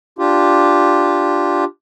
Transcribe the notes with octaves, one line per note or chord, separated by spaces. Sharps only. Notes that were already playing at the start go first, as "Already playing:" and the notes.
D4 F4 G4